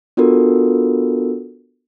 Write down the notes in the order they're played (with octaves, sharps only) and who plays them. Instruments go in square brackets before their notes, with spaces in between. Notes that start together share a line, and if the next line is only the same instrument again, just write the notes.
[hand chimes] B3 D4 F4 F#4 A4 A#4